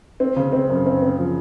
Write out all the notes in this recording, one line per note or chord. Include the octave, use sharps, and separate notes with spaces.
C4
C#3
C4
F#2
C4
C4
F3